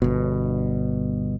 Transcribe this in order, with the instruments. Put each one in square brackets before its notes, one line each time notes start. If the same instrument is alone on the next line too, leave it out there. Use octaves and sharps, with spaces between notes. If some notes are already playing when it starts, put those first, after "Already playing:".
[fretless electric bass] G1 B2